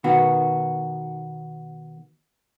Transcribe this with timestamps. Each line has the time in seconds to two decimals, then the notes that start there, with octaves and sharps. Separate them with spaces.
0.04 B2 D#3 B3 F#4